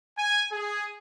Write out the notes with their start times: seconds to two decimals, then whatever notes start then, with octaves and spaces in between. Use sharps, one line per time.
0.18 G#5
0.52 G#4